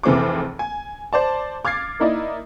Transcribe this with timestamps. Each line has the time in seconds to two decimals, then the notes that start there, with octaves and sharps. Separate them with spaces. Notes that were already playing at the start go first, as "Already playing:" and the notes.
0.03 F1 E3 C4 G#4 D6
0.59 G#5
1.13 C5 D5 A5
1.65 D6 F6 G#6 A6 C7
2.00 A#3 D#4 E4 D5 D#5